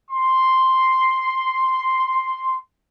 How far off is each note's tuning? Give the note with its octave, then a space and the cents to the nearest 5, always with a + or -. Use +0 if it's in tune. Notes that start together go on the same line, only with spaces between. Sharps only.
C6 +0